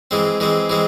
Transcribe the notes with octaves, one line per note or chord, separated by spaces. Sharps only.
E3 G#3 C4
E3 G#3 C4
E3 G#3 C4